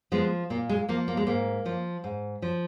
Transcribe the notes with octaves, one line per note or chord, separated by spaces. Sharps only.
F3 G#3 B3
A#2 A#3
G#3
F3 A#3
A#3
G#3
G#2 A#3
F3
G#2
F3